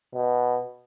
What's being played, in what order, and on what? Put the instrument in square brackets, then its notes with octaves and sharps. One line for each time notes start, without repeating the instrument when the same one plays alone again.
[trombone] B2